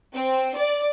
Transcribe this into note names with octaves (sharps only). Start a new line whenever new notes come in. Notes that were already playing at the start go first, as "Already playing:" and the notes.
C4
D5